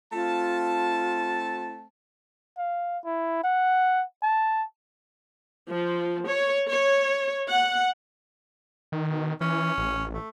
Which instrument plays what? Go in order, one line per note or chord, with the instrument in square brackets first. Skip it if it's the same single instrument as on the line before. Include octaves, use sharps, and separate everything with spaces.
[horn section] A3 C4 A5 [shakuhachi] F4
[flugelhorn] F5
E4
F#5
A5
[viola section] F3
C#5
C#5
F#5
[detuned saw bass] D#3
[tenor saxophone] B2
[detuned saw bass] E3 [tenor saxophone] C#4
[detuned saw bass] A1
[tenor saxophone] A3